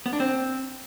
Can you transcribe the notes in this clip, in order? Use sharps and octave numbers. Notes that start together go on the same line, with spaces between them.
B3
D4
C4